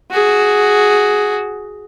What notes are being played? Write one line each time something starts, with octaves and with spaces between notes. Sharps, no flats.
F#4 G#4